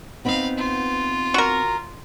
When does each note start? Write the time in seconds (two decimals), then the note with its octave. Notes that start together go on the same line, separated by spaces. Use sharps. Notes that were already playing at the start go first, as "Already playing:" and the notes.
0.25 B3 C4 D#4 F5 B5
0.57 F4
1.34 F#4 A#4